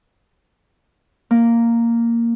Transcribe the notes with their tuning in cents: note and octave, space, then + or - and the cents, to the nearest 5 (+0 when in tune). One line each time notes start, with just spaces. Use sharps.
A#3 -5